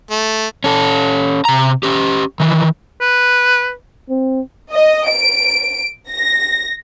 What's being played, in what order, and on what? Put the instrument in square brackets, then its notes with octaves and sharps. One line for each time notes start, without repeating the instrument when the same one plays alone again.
[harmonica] A3
[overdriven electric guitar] C#4 A4
C3 A#5
C#4 G4
D#3 E3
[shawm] B4
[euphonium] C4
[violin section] D#5
D7
A#6